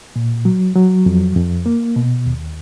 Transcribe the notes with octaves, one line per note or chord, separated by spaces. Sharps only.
A#2
F#3
F#3
F2
F2
A#3
B2
D#2